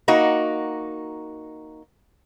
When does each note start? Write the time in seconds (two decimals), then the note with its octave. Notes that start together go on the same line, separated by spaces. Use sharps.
0.08 A#3 D#4 F#4